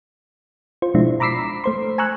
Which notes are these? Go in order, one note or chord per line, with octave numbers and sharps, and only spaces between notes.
F4 C5
B2 F3 G#3 D4 E4
A#5 B5 D6 E6 B6 C7
A3 C5 C6
G#5 A#5 C#6 E6 F#6